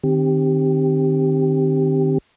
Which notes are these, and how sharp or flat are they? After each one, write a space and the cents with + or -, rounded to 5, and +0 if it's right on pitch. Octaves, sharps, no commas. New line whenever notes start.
D#3 -25 C4 +0 G4 +0